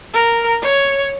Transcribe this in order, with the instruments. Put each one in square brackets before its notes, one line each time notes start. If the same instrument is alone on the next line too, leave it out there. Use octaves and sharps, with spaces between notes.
[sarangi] A#4
C#5